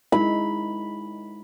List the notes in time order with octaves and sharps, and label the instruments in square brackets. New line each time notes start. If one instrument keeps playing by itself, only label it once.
[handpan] G#3 D#4 [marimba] E4 [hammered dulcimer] B5